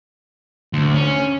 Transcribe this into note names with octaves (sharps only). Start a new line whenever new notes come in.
D2
C#4